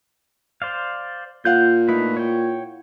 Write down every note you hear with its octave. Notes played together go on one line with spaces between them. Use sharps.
C5 D5 F5
A#2 F4 F5 F#5 G6
A3 D#4 E4 B4
C#5 G5